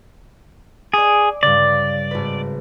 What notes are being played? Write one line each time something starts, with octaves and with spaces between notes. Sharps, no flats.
G#4 D5 D6
G2 C#3 D5
G#1 B4